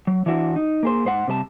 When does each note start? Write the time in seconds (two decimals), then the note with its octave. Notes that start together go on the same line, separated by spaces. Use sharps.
0.07 F#3
0.26 E3 D4 E4 F#4
0.56 D#4
0.83 A#3 G#4 C5
1.05 G#2 C5 F#5
1.27 C3 G3 B4 A5